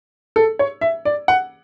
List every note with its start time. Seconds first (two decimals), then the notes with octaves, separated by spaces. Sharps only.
0.36 A4
0.59 C#5
0.81 E5
1.05 D5
1.28 F#5